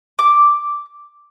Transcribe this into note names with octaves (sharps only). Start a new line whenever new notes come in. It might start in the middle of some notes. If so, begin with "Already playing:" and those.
D6